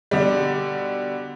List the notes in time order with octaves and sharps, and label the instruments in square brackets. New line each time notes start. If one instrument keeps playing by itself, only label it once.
[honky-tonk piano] B2 D3 G3